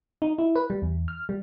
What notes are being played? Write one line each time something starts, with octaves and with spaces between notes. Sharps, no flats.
D#4
E4
B4
G3
E2
F6
G3